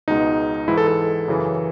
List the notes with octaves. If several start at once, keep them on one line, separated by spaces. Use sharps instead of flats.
C#2 B2 G#3 D#4
G#2 E3 G#3 E4
A4
A4
F#2 C#3 E3